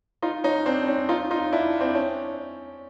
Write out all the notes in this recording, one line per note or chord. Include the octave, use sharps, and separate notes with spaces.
D#4 F4
C#4 D#4
C4 D4
C#4 D#4
D#4 F4
D#4 F4
D4 E4
C4 D4
C#4